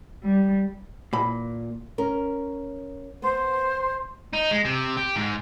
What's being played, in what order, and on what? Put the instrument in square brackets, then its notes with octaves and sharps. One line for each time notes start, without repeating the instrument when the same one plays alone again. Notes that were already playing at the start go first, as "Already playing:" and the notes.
[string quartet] G3
[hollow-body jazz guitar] A#2 [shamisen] E3 B5
[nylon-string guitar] C#4 A#4
[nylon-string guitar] B3 [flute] C5
[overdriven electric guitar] D#4
G#3
C3
G4
G#2